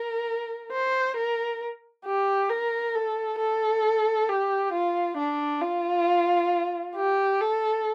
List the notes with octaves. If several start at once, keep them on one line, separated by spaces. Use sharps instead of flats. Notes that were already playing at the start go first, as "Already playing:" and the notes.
Already playing: A#4
C5
A#4
G4
A#4
A4
A4
G4
F4
D4
F4
G4
A4